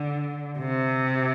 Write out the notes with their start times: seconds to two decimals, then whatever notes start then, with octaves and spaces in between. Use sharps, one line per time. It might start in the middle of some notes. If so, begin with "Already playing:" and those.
Already playing: D3
0.59 C3